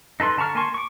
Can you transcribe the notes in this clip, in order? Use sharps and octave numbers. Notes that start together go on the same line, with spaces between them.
D#4 A4 B4 C6
D3 A5 A#5 C#6 F6
A#3 G#5 A5 C6 C#6
C#6 D6